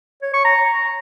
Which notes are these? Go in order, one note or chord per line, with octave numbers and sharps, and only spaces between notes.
C#5
C#6
A#5